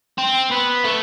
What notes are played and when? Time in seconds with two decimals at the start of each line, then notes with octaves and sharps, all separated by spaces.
0.18 C4
0.51 B3
0.84 A3